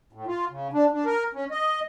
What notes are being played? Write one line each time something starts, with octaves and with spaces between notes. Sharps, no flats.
A2
F4
C#3
D4
D4
A#4
C#4
D#5